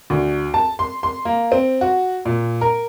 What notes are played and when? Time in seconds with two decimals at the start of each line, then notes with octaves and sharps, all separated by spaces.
0.10 D2
0.54 A5
0.79 C6
1.03 C6
1.25 A#3
1.52 C4
1.81 F#4
2.25 A#2
2.61 A#4